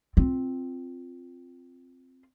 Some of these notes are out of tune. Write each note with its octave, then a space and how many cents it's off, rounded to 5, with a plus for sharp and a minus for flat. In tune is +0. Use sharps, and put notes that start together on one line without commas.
C4 +0 F4 +0